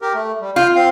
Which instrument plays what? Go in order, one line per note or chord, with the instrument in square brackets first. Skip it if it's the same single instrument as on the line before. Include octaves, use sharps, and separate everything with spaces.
[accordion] G4 A#4
A3
G3
[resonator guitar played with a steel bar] F4 [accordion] F6 G6
[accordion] C4 F5